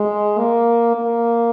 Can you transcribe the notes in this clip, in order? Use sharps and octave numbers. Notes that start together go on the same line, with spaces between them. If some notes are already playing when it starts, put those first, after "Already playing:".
Already playing: G#3
A#3
A#3